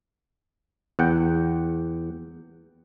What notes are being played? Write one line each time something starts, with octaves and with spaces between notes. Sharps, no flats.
E2 F#5 G5